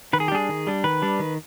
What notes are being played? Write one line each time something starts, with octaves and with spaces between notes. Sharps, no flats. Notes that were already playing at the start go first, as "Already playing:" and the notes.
D#3 B4
G#4
G4
G3 D4 G#4
D#3
G3 D4
D#3 B4
G3 D4
D#3